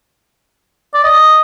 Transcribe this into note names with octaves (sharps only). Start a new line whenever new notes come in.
D5
D#5